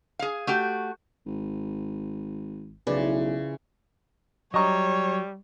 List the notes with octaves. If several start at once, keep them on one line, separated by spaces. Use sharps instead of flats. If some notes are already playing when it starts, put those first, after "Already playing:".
G#4 F5
A3 F#4 G4
G#1
B1 C#3 E3 F3 B4 D5
F#3 G3 C#5 D#5 A#5 C#6